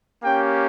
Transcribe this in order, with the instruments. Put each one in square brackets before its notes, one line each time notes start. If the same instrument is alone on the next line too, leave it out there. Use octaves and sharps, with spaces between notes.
[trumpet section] A#3 C#4 G4 G5